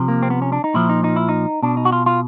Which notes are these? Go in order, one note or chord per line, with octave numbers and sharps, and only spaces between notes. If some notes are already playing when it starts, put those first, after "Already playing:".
Already playing: C3 F3
A#3
C4
B3
C#4
D4
D#4
A#2 F3 E4
D#4
D#4
E4
D#4
B2 D4
D#4
F#4
F4
F4